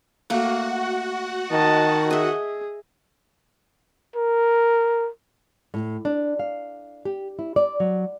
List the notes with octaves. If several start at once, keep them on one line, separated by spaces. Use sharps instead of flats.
A3 A#3 F#4 F#5
D#3 D#5 A5
G#4 D#5 E5
A#4
A2
D4
F5
G4
E4
D5
F#3